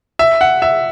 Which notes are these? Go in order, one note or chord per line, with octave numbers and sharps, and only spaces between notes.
E5
F#5
E5